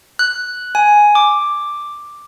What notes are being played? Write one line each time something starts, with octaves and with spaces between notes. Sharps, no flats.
F#6
G#5
D6